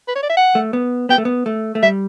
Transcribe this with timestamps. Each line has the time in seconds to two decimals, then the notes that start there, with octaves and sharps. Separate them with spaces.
0.08 B4
0.15 C#5
0.22 D5
0.30 E5
0.37 F#5
0.55 A3
0.73 B3
1.09 B3 G5
1.18 A3
1.25 B3
1.46 A3
1.75 A3
1.83 G3 E5